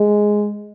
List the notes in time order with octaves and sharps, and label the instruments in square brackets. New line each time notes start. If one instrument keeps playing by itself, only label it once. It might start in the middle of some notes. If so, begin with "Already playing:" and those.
Already playing: [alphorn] G#3